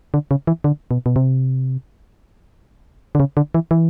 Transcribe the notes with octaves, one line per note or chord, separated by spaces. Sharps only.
D3
C#3
E3
D3
B2
B2
C3
D3
C#3
D3
E3
E3